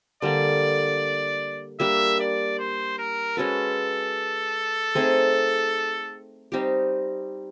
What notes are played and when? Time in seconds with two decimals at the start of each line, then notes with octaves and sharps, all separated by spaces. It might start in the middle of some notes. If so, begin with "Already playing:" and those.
0.22 D3 G3 A#3 D5
1.80 G3 A#3 D4 E5
2.20 D5
2.59 C5
2.98 A#4
3.37 G#3 C#4 F#4 A4 B4
4.95 A3 C4 D#4 G#4
6.52 G3 C4 D#4 G4